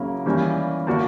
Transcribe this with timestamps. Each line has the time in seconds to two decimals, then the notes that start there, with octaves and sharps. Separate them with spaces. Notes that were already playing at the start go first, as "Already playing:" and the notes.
Already playing: C#3 F#3 A#3 E4
0.26 E3 G3 A#3 C#4 E4
0.87 D3 A#3 D4 F#4